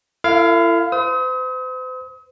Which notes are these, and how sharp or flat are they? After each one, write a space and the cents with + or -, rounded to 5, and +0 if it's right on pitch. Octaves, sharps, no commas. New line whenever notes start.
E4 +40 A4 +40 F5 +0
C5 -40 D#6 +40